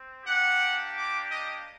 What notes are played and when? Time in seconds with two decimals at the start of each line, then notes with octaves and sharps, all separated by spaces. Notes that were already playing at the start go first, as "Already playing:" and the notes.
Already playing: C4
0.25 A#3 D4 G4 F#5
0.95 D6
1.29 D#5